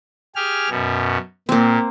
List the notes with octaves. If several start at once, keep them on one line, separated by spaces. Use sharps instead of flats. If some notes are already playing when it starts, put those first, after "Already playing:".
G4 G#4 F6
F#2 B2
A#2 A#3 C4